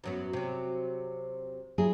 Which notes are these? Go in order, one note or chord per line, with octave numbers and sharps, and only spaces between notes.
F#2 F#3 B3
C3 F#3
F#3 E4 G#4